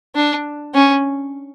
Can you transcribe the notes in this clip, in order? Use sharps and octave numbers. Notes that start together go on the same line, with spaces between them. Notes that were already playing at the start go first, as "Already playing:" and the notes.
D4
C#4